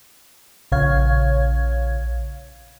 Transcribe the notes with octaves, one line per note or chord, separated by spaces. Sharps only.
A#1 C#3 C#5 F5 G#6